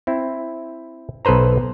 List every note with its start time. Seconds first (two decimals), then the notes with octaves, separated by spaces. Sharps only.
0.07 C4 E4
1.25 B1 A4 B4 C5 A#5